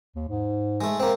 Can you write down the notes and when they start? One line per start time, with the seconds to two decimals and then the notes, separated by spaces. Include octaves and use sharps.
0.16 D#2
0.29 G#2
0.81 G#3 A3
1.00 A#3 C4